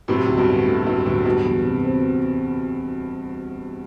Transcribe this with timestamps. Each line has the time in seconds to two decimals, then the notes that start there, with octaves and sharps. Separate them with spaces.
0.08 A2 C3 F#3
0.28 D2
0.37 G2 B2
0.48 D3
0.67 A2 A3
0.87 G2 F#3
1.06 D2 A2
1.25 G2 B2 F#3
1.45 E2
1.64 C3
1.85 C4